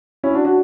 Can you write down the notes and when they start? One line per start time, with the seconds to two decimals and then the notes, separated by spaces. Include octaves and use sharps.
0.24 C#4 E4
0.34 D4 F#4
0.45 D4 F#4